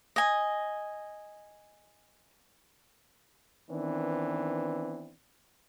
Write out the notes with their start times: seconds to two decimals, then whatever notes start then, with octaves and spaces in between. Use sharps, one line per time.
0.16 D#5 G#5
3.70 D#3 E3 B3 C4 D4